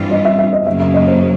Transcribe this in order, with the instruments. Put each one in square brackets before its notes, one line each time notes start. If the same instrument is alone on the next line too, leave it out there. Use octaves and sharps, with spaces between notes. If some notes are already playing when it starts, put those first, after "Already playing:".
Already playing: [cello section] G2 E3 G3 C4 F4
[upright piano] D#5
E5
E5
D#5
[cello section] F#2 C#3 F#3 A#3 [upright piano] E5
[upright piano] E5
D#5
C5